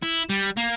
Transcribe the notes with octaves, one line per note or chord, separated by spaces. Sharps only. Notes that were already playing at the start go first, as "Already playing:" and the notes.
E4
G3
A#3